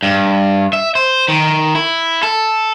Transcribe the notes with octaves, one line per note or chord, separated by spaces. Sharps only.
G2
E5
C5
D#3
E4
A4